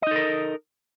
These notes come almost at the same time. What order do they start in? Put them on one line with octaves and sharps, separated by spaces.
D#5 D#4 A4 A#4